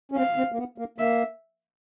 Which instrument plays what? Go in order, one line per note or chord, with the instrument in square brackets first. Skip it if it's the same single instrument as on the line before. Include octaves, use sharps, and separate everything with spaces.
[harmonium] C#4
[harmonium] C4 [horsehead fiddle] F5
[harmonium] C4
A#3
B3
A#3
[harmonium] A#3 [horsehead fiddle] E5